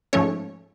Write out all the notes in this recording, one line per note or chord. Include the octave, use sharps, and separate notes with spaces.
G#2 F3 A3 C#4 C#5